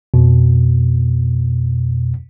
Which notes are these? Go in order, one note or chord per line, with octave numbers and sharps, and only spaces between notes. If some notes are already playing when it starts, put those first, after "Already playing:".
F2 B2